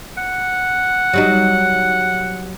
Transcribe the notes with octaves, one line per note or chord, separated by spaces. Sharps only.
F#5
F#3 G3 D#4